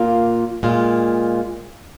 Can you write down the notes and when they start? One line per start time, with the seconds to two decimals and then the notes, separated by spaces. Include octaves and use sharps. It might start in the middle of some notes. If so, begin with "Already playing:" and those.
Already playing: A#2 A#3 F4
0.63 A#2 G#3 F4